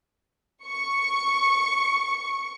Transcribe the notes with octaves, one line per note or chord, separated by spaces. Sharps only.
C#6 C#7